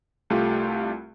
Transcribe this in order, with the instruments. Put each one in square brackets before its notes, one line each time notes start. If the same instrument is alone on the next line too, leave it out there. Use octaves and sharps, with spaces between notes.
[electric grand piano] C2 A3 F4 G4